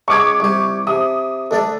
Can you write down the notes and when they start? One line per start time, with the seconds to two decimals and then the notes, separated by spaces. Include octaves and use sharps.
0.08 C#2 G#4 C#6 D6 G#6
0.40 C2 G4
0.87 C3 D#6
1.51 D2 A3 D4 D5